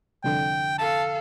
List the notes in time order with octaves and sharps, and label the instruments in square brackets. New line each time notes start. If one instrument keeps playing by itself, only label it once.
[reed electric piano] C2 F2 D3 [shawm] G5
[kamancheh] A4 F5 [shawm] A5